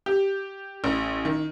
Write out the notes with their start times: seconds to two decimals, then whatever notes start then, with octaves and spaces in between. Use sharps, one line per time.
0.06 G4
0.84 A1
1.25 D#3